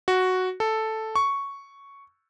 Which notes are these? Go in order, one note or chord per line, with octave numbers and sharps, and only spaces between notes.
F#4
A4
C#6